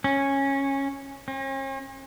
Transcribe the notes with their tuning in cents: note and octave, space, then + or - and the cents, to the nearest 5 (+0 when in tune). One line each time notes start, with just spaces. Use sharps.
C#4 -10
C#4 -45